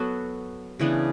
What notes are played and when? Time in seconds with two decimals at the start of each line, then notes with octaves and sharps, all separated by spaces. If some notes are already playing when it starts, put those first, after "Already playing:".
Already playing: F#3 B3 F#4 A4
0.79 C#3 E3 B3 D4